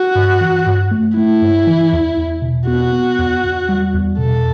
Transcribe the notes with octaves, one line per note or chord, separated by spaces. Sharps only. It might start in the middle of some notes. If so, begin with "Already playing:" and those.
Already playing: F#4
G2
E3
G2
A3
A3 E4
G2
E3
E2
E2
B2
B3 F#4
B3
E2
E2
G3
E2
B2 A4